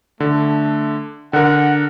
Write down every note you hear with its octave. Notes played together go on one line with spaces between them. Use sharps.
D3 A3
D3 A#4 F#5